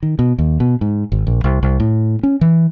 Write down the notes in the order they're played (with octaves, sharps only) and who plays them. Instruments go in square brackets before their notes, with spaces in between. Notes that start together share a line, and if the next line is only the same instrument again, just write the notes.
[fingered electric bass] D#3
B2
D#2
B2
G#2
G#1
A#1
C2
C2
A2
C#4
E3